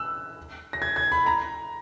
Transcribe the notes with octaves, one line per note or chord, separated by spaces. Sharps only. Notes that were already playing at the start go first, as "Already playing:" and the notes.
Already playing: E6 F#6
A#6
G#6
G#6
B5
A#5